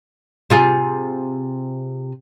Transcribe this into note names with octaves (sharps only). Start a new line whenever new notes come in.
C3 F4 G#4